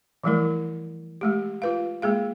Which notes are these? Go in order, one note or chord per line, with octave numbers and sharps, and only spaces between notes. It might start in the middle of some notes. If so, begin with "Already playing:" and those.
E3 F3 G3 A3 E4 A#4
G#3 A3 G4
F4 B4 F5
G#3 A#3 G#4 F5